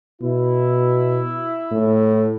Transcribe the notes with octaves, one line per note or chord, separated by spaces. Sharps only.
B2 E4
A2